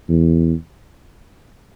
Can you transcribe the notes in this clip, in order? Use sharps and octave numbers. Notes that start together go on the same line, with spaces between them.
E2